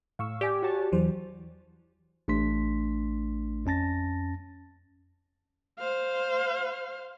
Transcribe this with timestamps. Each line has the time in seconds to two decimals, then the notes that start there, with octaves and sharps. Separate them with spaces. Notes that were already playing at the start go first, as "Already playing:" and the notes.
0.19 A2 F5 C#6 E6
0.41 G4 D5 G#5
0.62 F#4 C#5 A5
0.92 E2 E3 F#3 C5
2.28 A1 A3 D4 C6 B6
3.66 F2 C#4 A5 A6 A#6
5.79 C5 F5